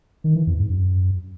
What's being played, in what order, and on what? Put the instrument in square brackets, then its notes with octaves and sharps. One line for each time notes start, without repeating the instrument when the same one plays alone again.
[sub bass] D#3
E3
F2
G#2
F#2